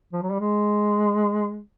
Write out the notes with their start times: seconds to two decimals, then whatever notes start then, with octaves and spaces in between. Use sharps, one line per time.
0.13 F3
0.22 F#3
0.31 G3
0.40 G#3